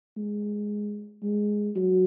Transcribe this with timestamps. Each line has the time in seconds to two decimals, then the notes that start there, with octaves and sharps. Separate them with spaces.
0.17 G#3
1.22 G#3
1.76 F#3